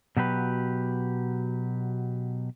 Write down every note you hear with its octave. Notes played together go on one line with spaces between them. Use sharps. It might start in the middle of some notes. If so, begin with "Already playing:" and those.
B2 F#3 G4 B4